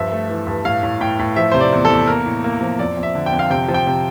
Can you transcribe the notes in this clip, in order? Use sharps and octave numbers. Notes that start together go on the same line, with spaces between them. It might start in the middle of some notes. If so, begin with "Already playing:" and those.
Already playing: G2 F3 E5
A3
E3
G2
A2 F5
A2
A2 G5
A2
F3 E5
C3 C5
D5
E2
A4
E2
A#3 A#4
A2
A#3
F3
F2 D5
F2
E5
D3
G5
F2
F5
C3 G5
F3
G5
C3